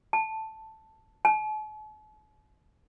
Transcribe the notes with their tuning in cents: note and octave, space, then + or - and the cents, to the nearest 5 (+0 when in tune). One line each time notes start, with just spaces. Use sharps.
A5 +0
A5 -45